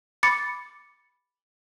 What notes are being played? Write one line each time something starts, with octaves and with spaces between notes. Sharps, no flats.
B5 D6 A6 C#7